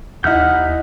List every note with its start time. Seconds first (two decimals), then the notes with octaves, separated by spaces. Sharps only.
0.24 D#2 E3 D#4 E5 F#5 F6 G6